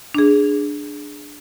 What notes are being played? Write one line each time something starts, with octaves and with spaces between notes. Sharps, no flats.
D4 G#4